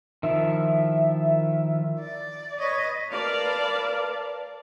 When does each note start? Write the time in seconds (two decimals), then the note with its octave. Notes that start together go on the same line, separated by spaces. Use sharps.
0.23 D#3 F3 E4 E5
1.99 D5
2.59 B4 C#5 D#5
3.11 A#4 B4 D5 F5 A5